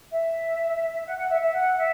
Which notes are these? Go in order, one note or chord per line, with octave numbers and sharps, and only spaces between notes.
E5
F#5
F#5
E5
E5
F#5
E5